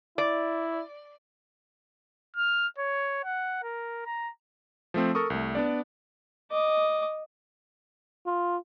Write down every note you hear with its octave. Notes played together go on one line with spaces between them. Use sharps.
E4 D5
F6
C#5
F#5
A#4
A#5
F3 A3 C4
A4 A#4 C#6 D#6
C2 A3
B3 D4 D5
D#5 D6
F4